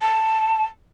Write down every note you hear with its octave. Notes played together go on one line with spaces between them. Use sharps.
A5